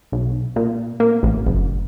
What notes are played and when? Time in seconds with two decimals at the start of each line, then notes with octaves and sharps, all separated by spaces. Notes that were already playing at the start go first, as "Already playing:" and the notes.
0.12 B1
0.56 A#2
1.00 A#3
1.23 A1
1.47 F#1